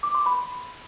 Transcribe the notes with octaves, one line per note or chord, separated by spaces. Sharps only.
D6
C6
B5